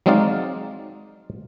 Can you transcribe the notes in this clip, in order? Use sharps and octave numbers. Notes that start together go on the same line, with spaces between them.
F#3 G#3 C4 D#4 D5 F5